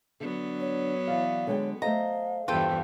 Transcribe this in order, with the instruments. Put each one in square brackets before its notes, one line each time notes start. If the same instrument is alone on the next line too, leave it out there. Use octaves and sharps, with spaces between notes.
[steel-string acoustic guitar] D3 D4 [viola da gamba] F#3 B3
[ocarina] C#5
[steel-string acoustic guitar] E3 D5 F5
[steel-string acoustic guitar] D3 G#3 G5 [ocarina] C#5
[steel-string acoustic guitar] A3 C5 D#5 [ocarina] F5 [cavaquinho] A#5
[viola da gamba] E2 G2 E3 [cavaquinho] F4 A4 G5 [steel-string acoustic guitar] C5